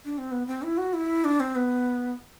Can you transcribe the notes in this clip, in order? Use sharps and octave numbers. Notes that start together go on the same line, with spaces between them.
D4
C4
B3
C4
E4
F#4
E4
D4
C4
B3